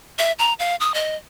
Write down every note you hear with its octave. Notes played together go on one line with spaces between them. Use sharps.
E5
A#5
F5
D#6
D#5